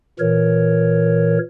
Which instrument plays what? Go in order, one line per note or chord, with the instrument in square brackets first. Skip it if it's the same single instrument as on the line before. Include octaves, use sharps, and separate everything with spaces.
[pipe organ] A#2 E3 A#4 C#5